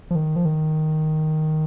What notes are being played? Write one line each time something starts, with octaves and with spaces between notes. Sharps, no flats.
F3
D#3
F3
D#3